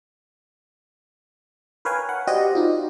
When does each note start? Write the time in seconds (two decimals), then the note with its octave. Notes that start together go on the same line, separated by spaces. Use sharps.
1.85 A#4 B4 C#5 F5 G5 G#5
2.09 F#5
2.27 F#4 G4 C5 D5 D#5
2.55 D#4 F4